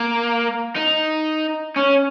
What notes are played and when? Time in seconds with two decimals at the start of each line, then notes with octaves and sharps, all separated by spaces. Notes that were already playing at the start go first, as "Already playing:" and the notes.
Already playing: A#3
0.76 D#4
1.76 C#4